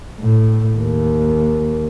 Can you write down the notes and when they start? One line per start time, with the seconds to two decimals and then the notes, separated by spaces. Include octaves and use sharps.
0.20 A2
0.78 D#2